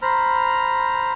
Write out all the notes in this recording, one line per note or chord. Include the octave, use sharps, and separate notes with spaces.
C5 A#5 B5 F6